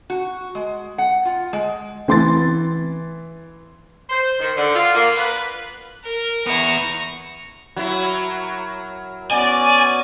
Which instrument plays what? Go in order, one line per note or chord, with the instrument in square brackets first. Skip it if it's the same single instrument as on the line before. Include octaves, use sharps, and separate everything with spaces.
[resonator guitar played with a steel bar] F#4
G#3
F#5
F4
G#3
[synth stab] C#3 A3 C4 [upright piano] E3 C6 A6
[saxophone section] C5
D#3
D3
F4
A#3
B4
[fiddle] A#4
[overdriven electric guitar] B3 E4 [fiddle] A#5 C#6
[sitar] F#3 E4 [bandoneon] A#4
[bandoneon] B3 C#4 F#4 [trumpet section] D5 [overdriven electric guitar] G#5